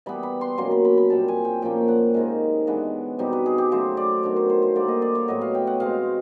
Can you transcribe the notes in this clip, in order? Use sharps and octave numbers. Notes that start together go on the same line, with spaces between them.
E3 G3 B3 B5
B5
C6
B2 F#3 A#3 C#4 C6
B5
B5
B5
A#2 G3 C4 A5
G#5
G5
A#2 F3 A#3 C#4 G5
F#5
C3 D#3 G#3 F5
E3 G#3 B3 D4
B2 G3 C4 D#4
B4
G#4
G4
C#3 F#3 A3 C5
D5
D#3 F#3 B3 D4 C#5
C5
C5
C5
D3 G3 A#3 D5
D#5
D5
C#5
A2 F#3 B3 D#5
F5
G5
F#5
B2 G#3 C4 F5